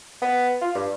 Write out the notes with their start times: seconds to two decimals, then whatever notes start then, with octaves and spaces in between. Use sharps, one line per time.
0.22 B3
0.61 F4
0.75 G2